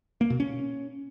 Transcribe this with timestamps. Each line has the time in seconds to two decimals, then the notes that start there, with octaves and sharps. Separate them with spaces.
0.21 A#3
0.30 B2
0.40 C#4